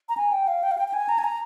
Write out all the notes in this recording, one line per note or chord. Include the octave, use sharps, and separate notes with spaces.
A#5
G#5
G5
F5
G5
F5
G5
G5
G#5
A#5
G#5
A#5